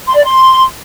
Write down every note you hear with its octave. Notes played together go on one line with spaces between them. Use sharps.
C6
D5
C6